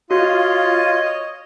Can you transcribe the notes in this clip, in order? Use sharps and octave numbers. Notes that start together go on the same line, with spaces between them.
F4 F#4 C#5 D#5